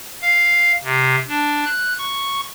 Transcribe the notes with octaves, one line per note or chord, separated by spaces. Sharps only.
F5
C3
D4
F#6
C#6